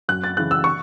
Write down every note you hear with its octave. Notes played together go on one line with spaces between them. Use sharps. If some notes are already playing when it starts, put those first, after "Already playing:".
F#2 F#6
A6
C#3 E3 F#6
E6
C#6